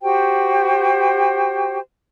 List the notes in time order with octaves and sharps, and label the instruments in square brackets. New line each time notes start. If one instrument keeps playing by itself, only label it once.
[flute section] F#4 G4 C5 G5